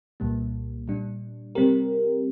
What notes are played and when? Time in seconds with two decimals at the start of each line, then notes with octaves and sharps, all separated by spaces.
0.20 C2 A#2 G3 A#3
0.88 A#2 G3 D4
1.55 C3 G3 C4 G4 A#4